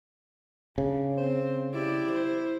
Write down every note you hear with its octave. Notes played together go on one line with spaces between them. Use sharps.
C#3 D4
C4 C5
E4 G4 D5
C5